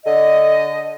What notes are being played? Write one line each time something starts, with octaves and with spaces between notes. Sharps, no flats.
D3 D#5